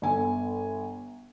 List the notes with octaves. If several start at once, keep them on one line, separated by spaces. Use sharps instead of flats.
G1 G#5